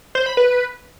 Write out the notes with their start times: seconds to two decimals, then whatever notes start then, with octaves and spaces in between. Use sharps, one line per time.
0.15 C5
0.26 B5
0.37 B4